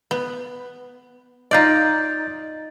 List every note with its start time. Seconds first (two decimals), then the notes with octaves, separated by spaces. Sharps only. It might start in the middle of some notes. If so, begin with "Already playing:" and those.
0.11 B3
1.51 D#4 F4 D5 D#5 G6 A6